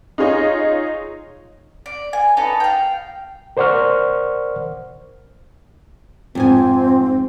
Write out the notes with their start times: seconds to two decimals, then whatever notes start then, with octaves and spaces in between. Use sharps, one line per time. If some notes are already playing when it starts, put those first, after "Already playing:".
0.18 D#4 F4 G#4 C#5 D#5
1.86 D5
2.13 G#5
2.37 D#4 A4 B4 C#5
2.60 F5 G5
3.57 A#4 C5 D5 F#5 C#6 F6
6.35 F2 G#2 C4 G#5